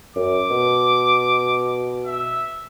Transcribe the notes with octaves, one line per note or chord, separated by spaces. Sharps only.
F#2 D6
B2
E5